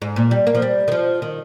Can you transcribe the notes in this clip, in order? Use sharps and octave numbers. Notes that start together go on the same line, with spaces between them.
G#2
A#2
G3
A#3
F3
G3
D#3
F3
D#3